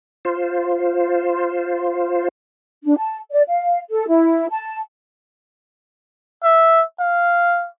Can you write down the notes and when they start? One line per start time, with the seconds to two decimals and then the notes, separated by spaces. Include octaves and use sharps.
0.25 F4 C5
2.84 D4
2.97 A5
3.31 D5
3.48 F5
3.90 A4
4.08 E4
4.51 A5
6.44 E5
7.00 F5